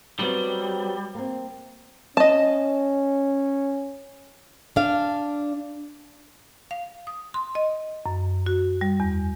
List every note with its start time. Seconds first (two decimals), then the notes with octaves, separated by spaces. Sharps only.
0.19 F#3 G3 B3 C4
1.15 A#3 C4
2.17 C#4 D#5 A5
4.76 D4 F5
6.71 F5
7.07 D#6
7.34 C6
7.55 D#5
8.06 F#2
8.46 F#4
8.81 G3
9.00 E2